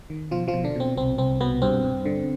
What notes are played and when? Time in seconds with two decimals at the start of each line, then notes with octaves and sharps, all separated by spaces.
0.10 D#3
0.31 B2 F3 F4
0.48 F3 F4
0.53 B2
0.64 D3 D4
0.76 B2 C4
0.97 C2 C4
1.18 C2 C4
1.41 B2 B3
1.62 G2 C4
1.84 G2
2.05 D3